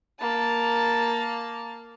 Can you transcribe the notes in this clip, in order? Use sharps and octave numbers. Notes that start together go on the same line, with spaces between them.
A#3 A5